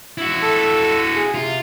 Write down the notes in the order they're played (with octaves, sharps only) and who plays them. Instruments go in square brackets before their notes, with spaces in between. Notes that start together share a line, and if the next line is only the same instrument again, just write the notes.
[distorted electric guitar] E4 F#4
[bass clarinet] A4
G#4
[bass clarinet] C3 [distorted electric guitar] F4